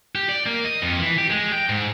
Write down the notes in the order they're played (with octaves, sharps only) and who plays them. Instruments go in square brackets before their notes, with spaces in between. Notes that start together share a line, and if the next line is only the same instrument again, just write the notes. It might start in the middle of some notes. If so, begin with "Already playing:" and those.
[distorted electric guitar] G4
D5
A#3
D#5
F2
E3
G4
G#3
G5
G#2